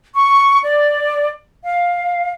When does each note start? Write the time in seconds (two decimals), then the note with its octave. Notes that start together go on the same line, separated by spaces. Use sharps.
0.15 C#6
0.63 D5
1.64 F5